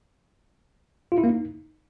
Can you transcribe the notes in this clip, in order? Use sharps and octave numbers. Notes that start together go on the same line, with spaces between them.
F4
E4
A#3
D#4